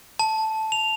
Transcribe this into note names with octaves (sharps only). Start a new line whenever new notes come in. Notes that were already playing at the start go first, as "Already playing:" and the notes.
A5
F7